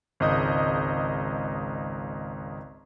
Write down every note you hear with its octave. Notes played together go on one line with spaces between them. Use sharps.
G#1 C#2 D#5 D#6 G6